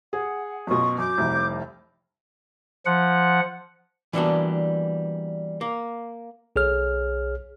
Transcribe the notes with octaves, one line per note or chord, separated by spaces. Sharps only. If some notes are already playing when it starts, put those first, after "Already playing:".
G#4 F#5
F#2 B2 F4 C#6 D#6
F#2 D6 G6
F1 C2
F3 F#5
E3 G3 A#3 B3 D4 F#4
A#3
B1 G#4 C#5 F6